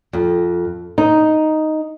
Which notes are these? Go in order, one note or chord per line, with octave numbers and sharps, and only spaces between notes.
F2
D#4